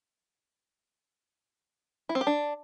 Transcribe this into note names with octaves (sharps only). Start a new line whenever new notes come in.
E4
C4
G4
D4